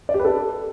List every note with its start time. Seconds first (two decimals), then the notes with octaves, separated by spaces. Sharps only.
0.09 D5
0.14 G4
0.19 B4
0.25 A4